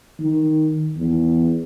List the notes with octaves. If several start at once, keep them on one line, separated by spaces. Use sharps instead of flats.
D#3
E2